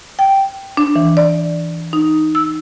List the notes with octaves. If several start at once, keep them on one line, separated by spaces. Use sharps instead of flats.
G5
D4
E3
D5
D#4
E6